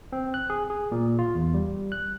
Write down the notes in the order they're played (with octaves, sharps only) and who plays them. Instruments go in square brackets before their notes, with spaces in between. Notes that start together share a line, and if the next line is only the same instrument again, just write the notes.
[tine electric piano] C4
F#6
G#4
G#4
A#2
F4
E2
G3
F#6